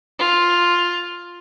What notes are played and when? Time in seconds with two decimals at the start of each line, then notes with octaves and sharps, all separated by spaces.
0.19 F4